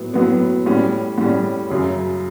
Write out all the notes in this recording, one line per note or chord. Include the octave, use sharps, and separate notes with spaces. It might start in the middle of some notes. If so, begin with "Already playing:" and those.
Already playing: A2 F#3 B3
A2 F#3 B3
A2 G3 C#4
A2 G3 C#4
F#2 C#3 F#3